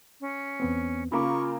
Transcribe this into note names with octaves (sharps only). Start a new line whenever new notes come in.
C#4
E2 B3 C4
C#3 A#3 F4 B5 C#6 D6